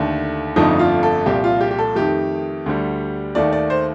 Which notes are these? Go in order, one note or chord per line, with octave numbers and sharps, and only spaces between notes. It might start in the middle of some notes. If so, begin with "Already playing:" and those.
Already playing: D#2 D3 A3
G1 F2 D3 F3 A3 D#4
F4
A4
C2 A#2 F3 G4
F4
G4
G4
A4
F2 D#3 A3 G4
D2 D3 G3
D#2 D#3 A3 D5
D5
C5